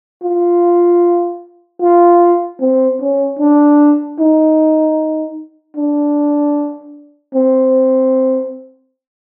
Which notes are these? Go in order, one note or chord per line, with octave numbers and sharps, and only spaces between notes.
F4
F4
C4
C#4
D4
D#4
D4
C4